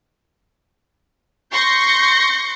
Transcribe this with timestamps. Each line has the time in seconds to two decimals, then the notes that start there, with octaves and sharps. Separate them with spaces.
1.52 C6 C#6 G6 A#6 C#7